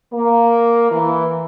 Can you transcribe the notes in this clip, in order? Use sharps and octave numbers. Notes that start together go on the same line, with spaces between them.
A#3
E3